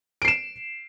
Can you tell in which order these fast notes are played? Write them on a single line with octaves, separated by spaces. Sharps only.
D7 C7 E7